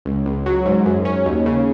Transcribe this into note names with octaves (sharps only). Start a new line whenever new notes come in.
C#2
C#2
F#3
G#2
F#2
C#4
D#2
C#3